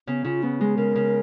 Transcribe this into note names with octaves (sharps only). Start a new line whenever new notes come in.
C#3 B3
C#3 F4
B3 C#4
G#3 G#4
C#3 A#4
C#3